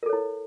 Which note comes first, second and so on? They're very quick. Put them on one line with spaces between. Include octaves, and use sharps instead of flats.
A#4 A4 C#5 E4